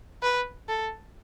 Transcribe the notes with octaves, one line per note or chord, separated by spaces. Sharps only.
B4
A4